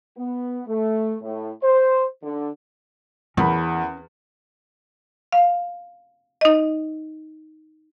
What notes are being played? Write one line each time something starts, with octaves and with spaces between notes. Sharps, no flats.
B3
A3
A2
C5
D3
E2 C#4 A#4 B5
F5
D#4 D#5